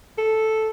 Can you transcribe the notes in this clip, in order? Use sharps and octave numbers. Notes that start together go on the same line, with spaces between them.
A4